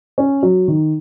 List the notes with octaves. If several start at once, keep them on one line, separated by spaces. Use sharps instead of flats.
C#4
F#3
D#3